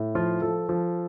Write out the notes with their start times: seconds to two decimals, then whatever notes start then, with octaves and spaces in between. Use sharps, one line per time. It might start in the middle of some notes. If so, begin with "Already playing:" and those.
Already playing: A2
0.15 F3 F4
0.42 F3 A4
0.69 F3